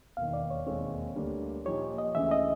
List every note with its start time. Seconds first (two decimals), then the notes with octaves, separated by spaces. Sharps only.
0.17 E1 D#2 D#3 F5
0.33 D5
0.51 C#5
0.67 E1 D#2 D#3 G#3 C4 C#5
1.16 D2 D3 G3 A#3 D4
1.65 A#2 F3 A#3 D#4 G4 C#5
1.98 D#5
2.15 D2 C#3 E3 E5
2.31 D#5